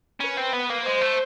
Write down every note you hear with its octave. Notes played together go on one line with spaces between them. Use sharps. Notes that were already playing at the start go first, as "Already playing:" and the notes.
C#4 B4
C4
B3
A#3
G#3 C5
A3